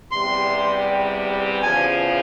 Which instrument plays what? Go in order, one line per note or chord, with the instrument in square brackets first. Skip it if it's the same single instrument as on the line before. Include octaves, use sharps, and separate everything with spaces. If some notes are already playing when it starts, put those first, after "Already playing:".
[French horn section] E2 C3 G3 [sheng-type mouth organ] C6
[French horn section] E2 C#3 F3 [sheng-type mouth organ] G#5